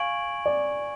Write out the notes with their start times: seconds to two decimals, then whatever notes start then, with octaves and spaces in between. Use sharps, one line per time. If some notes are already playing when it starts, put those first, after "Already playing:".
Already playing: F5 G#5 C#6 G#6 D7 F#7
0.46 D5